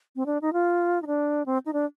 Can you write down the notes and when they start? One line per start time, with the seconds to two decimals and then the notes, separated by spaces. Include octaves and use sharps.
0.16 C4
0.26 D4
0.42 D#4
0.53 F4
1.02 D#4
1.07 D4
1.46 C4
1.66 D#4
1.73 D4